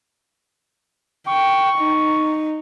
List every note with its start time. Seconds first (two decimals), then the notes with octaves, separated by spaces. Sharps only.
1.28 G5 C#6
1.78 D#4